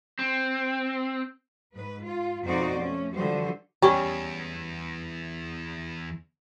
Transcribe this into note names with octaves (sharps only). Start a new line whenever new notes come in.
C4
G#2 B4
F4
F2 B2 D#4 F#4 C5 D5
A3 C#4
D3 E3 F3 G3 F#4 C5
E2 G3 C#4